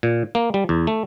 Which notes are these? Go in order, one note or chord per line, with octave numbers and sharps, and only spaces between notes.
A#2
A#3
G3
E2
A3